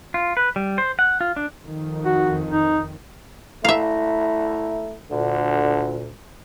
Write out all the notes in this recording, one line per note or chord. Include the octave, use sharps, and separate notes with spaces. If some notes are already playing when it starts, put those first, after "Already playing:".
F4
B4
G3
C5
F#5
F4
D4
F2 D#3
F#4
D#4
A3 E4 E5 F5 A#5
D2 A#2 D3